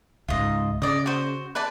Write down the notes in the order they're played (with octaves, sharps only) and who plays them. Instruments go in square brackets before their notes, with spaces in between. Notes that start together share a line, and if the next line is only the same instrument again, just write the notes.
[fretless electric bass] C#2 G#2 [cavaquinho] F4 D#5
[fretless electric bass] C#3 [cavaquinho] D5 D#5
[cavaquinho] F#4 C5
B4 D5 A5